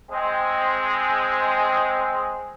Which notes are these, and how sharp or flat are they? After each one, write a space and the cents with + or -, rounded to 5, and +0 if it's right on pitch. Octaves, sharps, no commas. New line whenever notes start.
G#3 +0 C4 +0